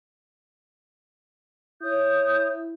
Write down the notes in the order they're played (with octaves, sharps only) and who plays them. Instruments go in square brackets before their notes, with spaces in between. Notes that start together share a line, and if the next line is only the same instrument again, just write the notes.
[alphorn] E4 [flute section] C#5 D#6 G6